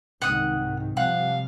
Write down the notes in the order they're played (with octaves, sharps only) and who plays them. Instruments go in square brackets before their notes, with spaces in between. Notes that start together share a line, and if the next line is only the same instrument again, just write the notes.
[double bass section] C2 G#2 D#3 [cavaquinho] F#5 D#6
[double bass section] C3 F3 G3 [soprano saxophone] F5 [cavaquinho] F#5